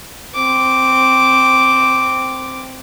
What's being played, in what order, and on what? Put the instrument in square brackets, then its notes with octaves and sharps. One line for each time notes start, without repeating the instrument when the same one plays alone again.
[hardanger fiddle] C4 D6